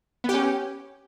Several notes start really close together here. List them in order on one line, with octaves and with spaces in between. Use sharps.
B3 G4 C#4